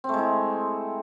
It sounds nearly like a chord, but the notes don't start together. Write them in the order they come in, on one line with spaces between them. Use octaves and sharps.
C4 A3 G#3 E4